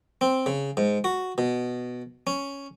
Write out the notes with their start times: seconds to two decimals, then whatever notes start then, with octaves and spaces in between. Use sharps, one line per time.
0.21 C4
0.46 C#3
0.77 G#2
1.04 F#4
1.38 B2
2.27 C#4